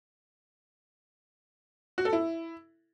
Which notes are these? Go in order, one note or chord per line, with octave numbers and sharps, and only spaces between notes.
F#4
A4
E4